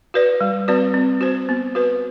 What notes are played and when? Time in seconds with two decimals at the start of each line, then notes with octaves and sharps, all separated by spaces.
0.14 F#4 B4 D5
0.41 G3
0.68 C4 F#4 B4 D5
0.94 C4
1.21 F#4 C5
1.49 B3
1.75 F#4 B4